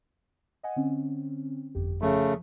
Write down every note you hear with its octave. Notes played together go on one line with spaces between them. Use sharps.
D#5 F#5 G#5
D3 C4 C#4
G1 F2 G4
C#3 F3 A3